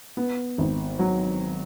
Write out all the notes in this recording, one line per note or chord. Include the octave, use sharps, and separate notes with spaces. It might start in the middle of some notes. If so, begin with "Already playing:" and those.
B3
G#1
F#3